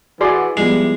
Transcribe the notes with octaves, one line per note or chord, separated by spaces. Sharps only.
E3 F#4 G#4 D5 C6
F3 G3 G#3 B3 E4